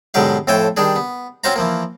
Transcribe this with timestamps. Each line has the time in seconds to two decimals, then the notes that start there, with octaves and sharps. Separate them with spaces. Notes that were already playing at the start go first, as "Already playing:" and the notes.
0.14 G#2 B2 D3 F#3 G4 F5
0.47 F2 A2 A4 C#5 G5 G#5
0.77 D#3 G3 D4 G#4
0.96 B3
1.44 C4 C#4 F#4 C5 F5 A#5
1.56 E3 F3 A#3